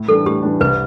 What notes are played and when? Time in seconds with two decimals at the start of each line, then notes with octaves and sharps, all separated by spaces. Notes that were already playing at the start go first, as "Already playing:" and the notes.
Already playing: A2
0.08 E3 G3 D4 A4
0.25 A2 G4
0.43 E3 G3 D4
0.60 C2 B4